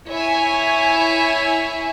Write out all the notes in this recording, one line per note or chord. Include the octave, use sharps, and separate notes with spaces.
E4 C#5 E5 G#5